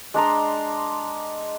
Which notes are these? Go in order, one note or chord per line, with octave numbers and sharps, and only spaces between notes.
G#3 D4 A#5 C6